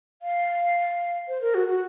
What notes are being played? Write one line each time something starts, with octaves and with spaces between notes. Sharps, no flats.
F5
C5
A#4
F#4
F#4